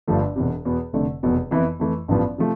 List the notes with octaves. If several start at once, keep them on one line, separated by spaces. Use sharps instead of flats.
G1 G2 F3 A3
E1 E2 C3
E2 B2 B3
F1 F2 D3 A3
F1 E2 B2
F2 E3 B3 E4
F2 E3 A3
A1 G2 F3 B3
C3 F3 A3